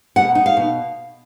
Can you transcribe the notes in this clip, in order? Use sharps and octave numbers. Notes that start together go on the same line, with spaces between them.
B2 F#5
D#4
F5
B2